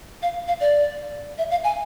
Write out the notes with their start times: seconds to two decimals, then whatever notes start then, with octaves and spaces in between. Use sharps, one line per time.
0.22 F5
0.48 F5
0.60 D5
1.38 E5
1.51 F5
1.64 G#5